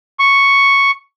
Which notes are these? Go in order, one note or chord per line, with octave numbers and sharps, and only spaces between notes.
C#6